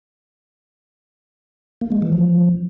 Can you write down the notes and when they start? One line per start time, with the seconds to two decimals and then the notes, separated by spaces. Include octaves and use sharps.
1.81 A#3
1.92 G#3
2.02 E3
2.13 F3